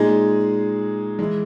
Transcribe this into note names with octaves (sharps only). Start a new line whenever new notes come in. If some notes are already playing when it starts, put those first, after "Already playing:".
Already playing: A#2 G#3 D#4 G#4
E3 G#3